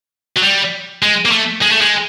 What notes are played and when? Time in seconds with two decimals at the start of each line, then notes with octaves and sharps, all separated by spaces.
0.36 F#3
0.42 G3
1.02 G#3
1.25 A#3
1.31 A3
1.62 G#3
1.71 A3
1.81 G#3